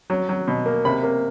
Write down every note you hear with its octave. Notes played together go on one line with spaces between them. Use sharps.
F#3
F#3
B2
A#3
C3 B5
A#3